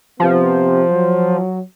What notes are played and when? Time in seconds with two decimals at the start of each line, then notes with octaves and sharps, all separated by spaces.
0.20 C3 F3 B3
0.90 F#3